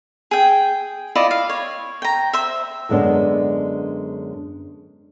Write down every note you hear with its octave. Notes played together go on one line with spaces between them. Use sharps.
G#4 G5
E4 F4 D5 D#5
F5
C#5
G5 A#5
C5 E5
F#2 D3 G#3 B3 D4